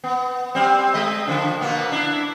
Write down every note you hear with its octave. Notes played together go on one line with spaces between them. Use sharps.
B3
G3 C4
G#3 D#5
D3 F3 D4
B2 A#3 B3
D4 E4